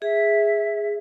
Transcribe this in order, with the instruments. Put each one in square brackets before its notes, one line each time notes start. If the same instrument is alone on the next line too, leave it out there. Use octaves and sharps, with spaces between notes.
[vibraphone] G#4 [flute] E5